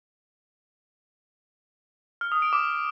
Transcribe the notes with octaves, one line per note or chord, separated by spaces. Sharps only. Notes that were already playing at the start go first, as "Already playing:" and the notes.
F6
D#6
D7
D6